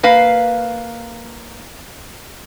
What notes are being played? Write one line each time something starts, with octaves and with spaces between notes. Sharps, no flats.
A#3 B4 F5